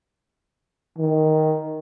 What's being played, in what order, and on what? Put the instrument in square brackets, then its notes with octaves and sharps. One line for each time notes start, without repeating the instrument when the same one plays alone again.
[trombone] D#3